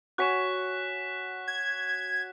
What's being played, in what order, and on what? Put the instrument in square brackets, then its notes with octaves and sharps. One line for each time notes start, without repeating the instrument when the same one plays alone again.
[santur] F#4 C#5 G#5 [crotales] F#6 B6 E7
[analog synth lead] G#6